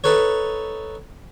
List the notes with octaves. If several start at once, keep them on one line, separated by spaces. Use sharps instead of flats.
D#4 A4 B4 C#5